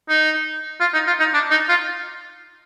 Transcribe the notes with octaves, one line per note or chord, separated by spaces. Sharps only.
D#4
F4
D#4
F4
D#4
D4
D#4
F4